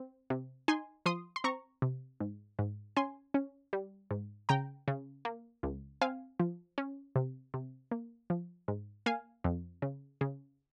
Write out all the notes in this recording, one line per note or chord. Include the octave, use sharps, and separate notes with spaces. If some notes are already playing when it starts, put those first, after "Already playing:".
Already playing: C4
C3
D#4 G#5 C6
F3 C6 D#6
C6
C4 A#5 C#6
C3
G#2
G#2
C#4 G#5 C6
C#4
G3
G#2
C#3 G5 A#5
C#3
A#3
C#2
C4 F5 G#5
F3
C#4
C3
C3
A#3
F3
G#2
A#3 F5 G#5
F2
C#3
C#3